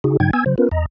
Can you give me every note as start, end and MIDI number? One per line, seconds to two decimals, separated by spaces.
0.04 0.17 49
0.04 0.17 63
0.04 0.17 66
0.04 0.17 68
0.20 0.31 43
0.20 0.31 49
0.20 0.31 54
0.20 0.31 63
0.20 0.31 79
0.20 0.31 92
0.33 0.44 59
0.33 0.44 80
0.33 0.44 88
0.33 0.44 92
0.46 0.55 49
0.46 0.55 54
0.46 0.55 72
0.58 0.69 59
0.58 0.69 61
0.58 0.69 65
0.58 0.69 70
0.58 0.69 71
0.71 0.86 40
0.71 0.86 75
0.71 0.86 82